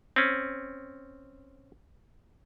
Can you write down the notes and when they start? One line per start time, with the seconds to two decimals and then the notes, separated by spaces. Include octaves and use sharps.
0.16 C4 C#4